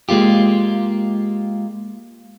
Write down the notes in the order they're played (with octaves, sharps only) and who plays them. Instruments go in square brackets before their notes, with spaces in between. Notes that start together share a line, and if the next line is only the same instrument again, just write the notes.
[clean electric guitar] G#3 A#3 F4 G4